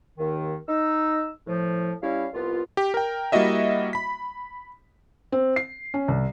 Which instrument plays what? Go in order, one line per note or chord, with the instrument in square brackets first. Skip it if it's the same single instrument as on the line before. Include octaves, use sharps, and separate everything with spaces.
[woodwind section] D#2 D#3
D#4 E6
A2 F3
G3 C#4 E4 F5
C2 B3 F4
[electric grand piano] G4
A#4 G5
G3 A#3 E4 F#4 D#5 E5
B5 B6
[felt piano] C4
C7
C#4
C2